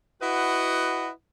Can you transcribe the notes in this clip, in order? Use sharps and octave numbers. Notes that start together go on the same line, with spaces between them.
E4 F#4 B4 D#5 F#5